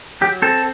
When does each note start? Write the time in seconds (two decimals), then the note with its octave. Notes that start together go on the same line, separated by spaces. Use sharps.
0.21 F#3 G4
0.42 C4 A4